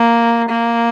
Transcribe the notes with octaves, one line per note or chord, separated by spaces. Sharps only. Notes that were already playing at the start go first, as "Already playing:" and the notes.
Already playing: A#3
A#3